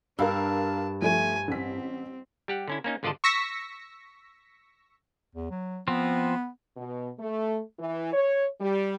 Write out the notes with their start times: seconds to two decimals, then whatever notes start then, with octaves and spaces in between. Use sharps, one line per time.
0.19 G2 D4 A#4 F5 A5 E6
1.02 F3 A3 G#5
1.48 A1 C4 B6
2.48 G3 G4 F#5
2.68 D3 C#4 E4
2.84 A#3 C#4 D#4
3.03 G#1 D3 F4 D5 D#5 A5
3.24 C#6 E6 A#6 B6 C#7
5.35 E2
5.51 F#3
5.88 F3 B3 C4
6.77 B2
7.19 A3
7.79 E3
8.13 C#5
8.60 G3